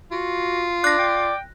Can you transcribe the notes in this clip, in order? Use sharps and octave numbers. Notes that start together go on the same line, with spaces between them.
F4 F#4
D4 D5 F#6 A#6
G5